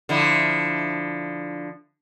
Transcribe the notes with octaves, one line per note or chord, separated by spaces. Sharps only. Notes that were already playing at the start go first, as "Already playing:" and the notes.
D3 F3 E4